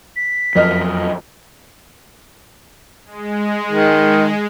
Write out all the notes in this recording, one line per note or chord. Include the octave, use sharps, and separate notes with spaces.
B6
F#1 F2 F3 F#3 D#5 F6
G#3
D#3